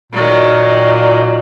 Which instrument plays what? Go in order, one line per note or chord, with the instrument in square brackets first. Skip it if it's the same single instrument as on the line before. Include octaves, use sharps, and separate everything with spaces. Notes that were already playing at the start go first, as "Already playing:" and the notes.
[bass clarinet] A#2 [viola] D#3 F#3